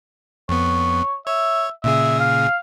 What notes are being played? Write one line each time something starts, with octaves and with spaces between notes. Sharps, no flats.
F2 B3 C#5
C#5 E5
A#2 C#3 G#4 E5
F5